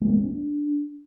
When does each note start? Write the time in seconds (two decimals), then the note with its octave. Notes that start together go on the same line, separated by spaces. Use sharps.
0.01 G#3
0.09 A#3
0.17 C4
0.24 D4